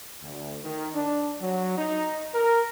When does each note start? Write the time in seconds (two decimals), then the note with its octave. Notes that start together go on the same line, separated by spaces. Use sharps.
0.22 D2
0.63 D#3
0.94 D4
1.41 F#3
1.77 D#4
2.33 A#4